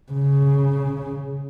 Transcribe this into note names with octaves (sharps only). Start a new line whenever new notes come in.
C#3